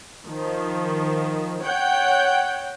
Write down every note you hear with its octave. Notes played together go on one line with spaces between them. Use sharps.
D#3 F3
C#5 F#5 G5 G6